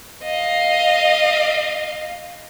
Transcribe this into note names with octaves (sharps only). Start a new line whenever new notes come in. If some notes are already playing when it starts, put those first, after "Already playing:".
D#5 F5